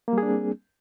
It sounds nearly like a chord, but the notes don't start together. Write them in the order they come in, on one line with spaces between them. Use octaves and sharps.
A#3 G3 G#4 D4 C4